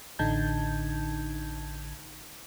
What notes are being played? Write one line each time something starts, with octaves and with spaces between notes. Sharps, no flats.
A1 D3 D#4 A5 G6 G#6